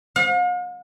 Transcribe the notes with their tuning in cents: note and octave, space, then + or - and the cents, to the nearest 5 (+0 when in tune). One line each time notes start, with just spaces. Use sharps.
F5 +45